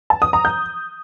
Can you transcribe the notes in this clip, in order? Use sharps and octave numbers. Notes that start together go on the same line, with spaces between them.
A5
D#6
A#5
G6